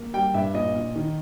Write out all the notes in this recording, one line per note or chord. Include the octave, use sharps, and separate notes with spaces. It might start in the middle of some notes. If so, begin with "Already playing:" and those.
Already playing: A#3
G3 G5
G2 E5
A#2 D#5
A#2
D#3